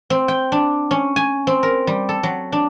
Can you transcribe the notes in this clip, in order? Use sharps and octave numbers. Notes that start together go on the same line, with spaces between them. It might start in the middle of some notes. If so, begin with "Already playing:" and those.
C4
G5
D4
C#4
G#5
C4
A#4
G3
A4
F#3
D4